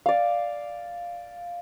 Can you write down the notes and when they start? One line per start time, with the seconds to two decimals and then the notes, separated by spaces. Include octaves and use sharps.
0.06 D5 F5